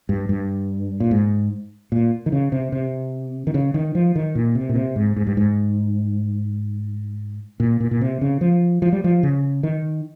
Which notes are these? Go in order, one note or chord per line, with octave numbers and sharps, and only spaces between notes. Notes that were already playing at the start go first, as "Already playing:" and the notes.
G2
G2
A#2
G#2
A#2
D#3
C#3
C3
C3
D#3
C#3
D#3
F3
D#3
A#2
C3
A#2
C3
G#2
G#2
G2
G#2
A#2
A#2
A#2
C3
C#3
F3
F3
G3
F3
C#3
D#3